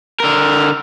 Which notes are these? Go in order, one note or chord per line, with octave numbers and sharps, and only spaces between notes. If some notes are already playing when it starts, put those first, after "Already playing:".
D3 A#4